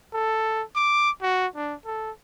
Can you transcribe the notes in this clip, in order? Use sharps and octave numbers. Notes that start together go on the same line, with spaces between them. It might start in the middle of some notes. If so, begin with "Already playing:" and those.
A4
D6
F#4
D4
A4